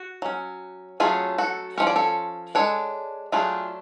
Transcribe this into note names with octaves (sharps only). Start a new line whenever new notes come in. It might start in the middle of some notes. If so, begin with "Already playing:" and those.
Already playing: F#4
F#3 C#4
F#3 A3 C#4 F4 G#4
F#4 A4
F3 A3 C#4 C#5
D5
A4 C#5
G#3 D4 A4 C#5
F#3 A3 D4 F4 G#4